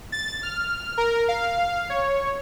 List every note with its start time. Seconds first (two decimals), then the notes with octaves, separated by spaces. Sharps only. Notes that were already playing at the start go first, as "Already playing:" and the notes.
0.12 A6
0.43 F6
0.98 A#4
1.28 F5
1.90 C#5